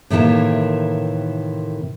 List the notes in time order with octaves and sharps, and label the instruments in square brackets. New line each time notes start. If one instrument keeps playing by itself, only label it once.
[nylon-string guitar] A2 C3 D#3 E3 A3 A#3